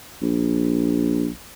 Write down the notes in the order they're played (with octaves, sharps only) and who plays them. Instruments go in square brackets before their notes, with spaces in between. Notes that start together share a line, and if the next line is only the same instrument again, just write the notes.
[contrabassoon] A#1